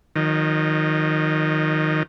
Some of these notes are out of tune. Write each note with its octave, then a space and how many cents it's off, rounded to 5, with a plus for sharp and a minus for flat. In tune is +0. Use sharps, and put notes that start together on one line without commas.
D#3 +0 F#3 -45 D#5 -30